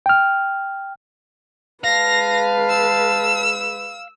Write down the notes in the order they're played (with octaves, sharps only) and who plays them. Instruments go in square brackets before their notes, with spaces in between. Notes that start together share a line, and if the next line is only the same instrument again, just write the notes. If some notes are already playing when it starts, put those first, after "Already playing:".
[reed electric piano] G5 F6
[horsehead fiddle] G#3 B4 [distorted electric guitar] F5 [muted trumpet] A5 [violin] A#6
[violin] E6